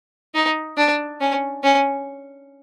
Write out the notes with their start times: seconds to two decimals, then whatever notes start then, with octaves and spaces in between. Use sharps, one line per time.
0.34 D#4
0.77 D4
1.20 C#4
1.63 C#4